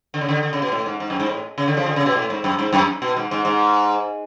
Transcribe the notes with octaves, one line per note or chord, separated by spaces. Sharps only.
D3
C#3
D3
D3
C#3
B2
A2
G#2
G#2
F#2
G#2
A2
C#3
D3
C#3 F3
D3
C#3
B2
A2
G#2
F#2
G#2
F#2
B2
G#2
G#2
G#2